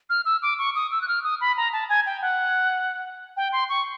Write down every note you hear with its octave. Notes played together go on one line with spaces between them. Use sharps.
F6
E6
D6
C#6
D#6
E6
F#6
F6
D#6
B5
A#5
A5
G#5
G5
F#5
G5
C6
C#6